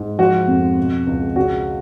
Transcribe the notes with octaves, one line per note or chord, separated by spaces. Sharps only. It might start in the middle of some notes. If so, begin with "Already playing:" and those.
Already playing: G#2
F3 F#4
F2
B2
C#2
C#3 F#4